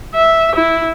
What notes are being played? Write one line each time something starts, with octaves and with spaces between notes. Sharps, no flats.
E5
E4